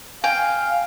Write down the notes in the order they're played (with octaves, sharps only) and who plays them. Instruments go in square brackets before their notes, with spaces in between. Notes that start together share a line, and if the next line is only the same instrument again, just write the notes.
[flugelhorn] F5 [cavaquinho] G5 [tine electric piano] G#5